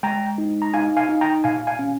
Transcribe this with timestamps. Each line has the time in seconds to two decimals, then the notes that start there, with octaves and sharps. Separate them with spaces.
0.03 G#3 G5 A#5
0.38 D#4
0.62 A#5
0.74 D#4 F5 G#5
0.97 F5 G#5
1.09 D#4
1.21 G5 A#5
1.44 A#2 F5 G#5
1.67 F5 G#5
1.79 C#4